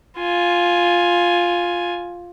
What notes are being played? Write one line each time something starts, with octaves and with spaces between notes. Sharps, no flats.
F4 G#5